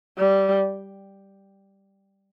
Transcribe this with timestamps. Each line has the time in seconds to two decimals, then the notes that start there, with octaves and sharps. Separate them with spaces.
0.18 G3